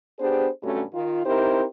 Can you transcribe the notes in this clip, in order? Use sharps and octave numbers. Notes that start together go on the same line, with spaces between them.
B3 D4 G4 G#4 C5
G2 C3 F#3 A3 C#4 F#4
D#3 F4
C4 D#4 E4 G4 A#4 C5